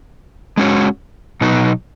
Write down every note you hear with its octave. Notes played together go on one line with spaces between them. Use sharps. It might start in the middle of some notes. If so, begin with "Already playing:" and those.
G#3 C#4 F#4 C#5
B2 F#3 B3 D#4 F#4